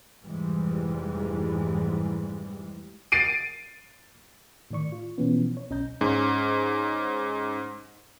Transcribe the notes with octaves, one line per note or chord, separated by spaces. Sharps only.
F1 G#2 E3 G3 G#3
A6 C7 D7 D#7
A2 D#3 D5 C#6
F4
B2 E3 F3 B3 C#4
C#5
B1 C#4 D#5 A#5 G6
G#2 C#4